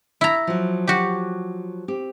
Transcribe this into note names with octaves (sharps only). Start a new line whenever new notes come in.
E4 A#5
F3 F#3
F#4 G4
C4 G4